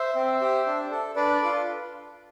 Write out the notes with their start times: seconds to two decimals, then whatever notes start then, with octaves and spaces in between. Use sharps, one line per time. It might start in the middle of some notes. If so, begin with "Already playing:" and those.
Already playing: C5 E5
0.16 C4
0.41 G4
0.66 D4
0.91 A4
1.16 D4 B4 D5
1.42 F4 A4